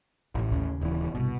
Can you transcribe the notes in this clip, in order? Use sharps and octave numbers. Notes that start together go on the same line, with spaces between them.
A1 A2 D#3
D#2 C#3
D#1 E3
G1 C2 B2